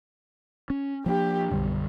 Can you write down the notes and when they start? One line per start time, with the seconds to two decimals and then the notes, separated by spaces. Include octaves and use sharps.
0.70 C#4
1.06 F3 A#3 D4 G4
1.51 B1 F#2 D3 G3